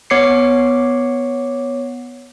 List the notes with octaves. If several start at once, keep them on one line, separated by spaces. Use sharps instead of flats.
B3 C#5 D6 C7 C#7